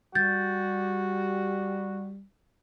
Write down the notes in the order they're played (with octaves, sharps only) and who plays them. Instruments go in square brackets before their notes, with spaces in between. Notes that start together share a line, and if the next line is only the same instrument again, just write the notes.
[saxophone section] G3 [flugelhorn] F#4 [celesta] G6 A6